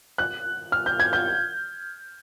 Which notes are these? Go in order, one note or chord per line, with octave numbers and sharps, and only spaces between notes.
F#6
F6
G6
G#6
G6